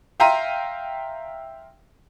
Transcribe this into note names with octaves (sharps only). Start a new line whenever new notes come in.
E5 F5 G5 A#5 C6 D#7